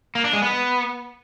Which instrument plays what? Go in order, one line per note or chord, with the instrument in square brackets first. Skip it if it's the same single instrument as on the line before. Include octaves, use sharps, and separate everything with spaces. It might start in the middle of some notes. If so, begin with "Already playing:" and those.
[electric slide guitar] A#3
D4
G#3
B3